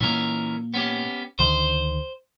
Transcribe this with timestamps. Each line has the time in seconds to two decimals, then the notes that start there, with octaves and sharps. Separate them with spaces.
0.01 A#2 E3 A#3 C#4 A#4
0.74 B3 C#4 G4
1.39 D2 D3 D#3 C5